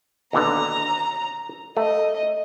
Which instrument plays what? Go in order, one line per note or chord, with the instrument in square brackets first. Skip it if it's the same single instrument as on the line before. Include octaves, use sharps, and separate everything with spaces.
[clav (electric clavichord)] D#2 B2 D3 [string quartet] A#5
[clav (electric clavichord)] A3 [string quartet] D#5